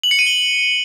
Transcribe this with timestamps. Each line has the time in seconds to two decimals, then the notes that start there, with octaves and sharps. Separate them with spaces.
0.03 F#7
0.11 C#7
0.19 D#7
0.27 G7